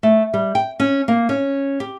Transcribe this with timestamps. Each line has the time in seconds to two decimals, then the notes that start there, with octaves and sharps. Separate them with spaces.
0.03 A3
0.34 G3
0.55 G5
0.80 C#4
1.08 A#3
1.29 C#4
1.80 G4